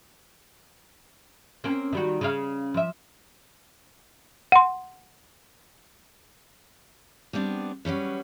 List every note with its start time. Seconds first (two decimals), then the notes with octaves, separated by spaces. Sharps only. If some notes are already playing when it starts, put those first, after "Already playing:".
1.64 A#3 C4 C#4
1.93 D#3 G3 F#4
2.21 C#3 F5
2.74 F3 E5
4.52 F#5 C6
7.33 G3 B3 C4 D4
7.85 F#3 G3 C#4 B4